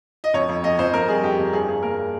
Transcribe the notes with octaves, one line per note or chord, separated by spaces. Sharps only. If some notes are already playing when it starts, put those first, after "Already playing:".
D#5
F2 C#5
F2
F2 D#5
F2 C5
F2 A#4
G3 G#4
F2 G4
F2
G2 G#4
G2 G#4
A#3 A#4